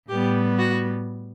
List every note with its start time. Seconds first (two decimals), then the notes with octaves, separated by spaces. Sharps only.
0.09 A2 G3 B3 G4
0.58 F#4